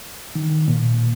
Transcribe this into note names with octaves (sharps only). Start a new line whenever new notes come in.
D#3
A#2